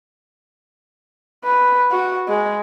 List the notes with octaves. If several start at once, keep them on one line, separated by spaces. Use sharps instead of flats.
B4
F#4
G#3